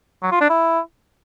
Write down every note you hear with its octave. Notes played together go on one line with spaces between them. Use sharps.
F#3
F4
D4
E4